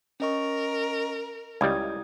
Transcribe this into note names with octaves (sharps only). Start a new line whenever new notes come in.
C#4 A#4 D#5 C#6
C#2 G3 E4 D#6 G#6